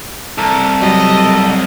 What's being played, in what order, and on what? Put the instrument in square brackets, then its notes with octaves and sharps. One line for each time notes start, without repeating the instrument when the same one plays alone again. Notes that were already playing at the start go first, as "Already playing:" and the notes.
[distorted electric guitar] C2 [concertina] A4 [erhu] A#4
[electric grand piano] F#3 G3 [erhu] D#5